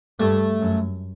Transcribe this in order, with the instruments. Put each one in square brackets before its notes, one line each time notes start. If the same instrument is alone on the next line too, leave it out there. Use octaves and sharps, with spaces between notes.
[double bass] G2 [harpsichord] A3
[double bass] F#2